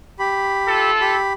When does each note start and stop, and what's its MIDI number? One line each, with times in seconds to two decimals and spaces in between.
0.19 0.91 67
0.19 0.91 83
0.67 1.16 65
0.67 1.16 69
1.01 1.33 67
1.01 1.33 83